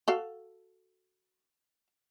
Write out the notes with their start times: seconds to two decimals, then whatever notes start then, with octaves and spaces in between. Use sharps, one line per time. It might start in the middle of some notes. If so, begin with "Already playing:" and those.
0.08 F#4 A4 F5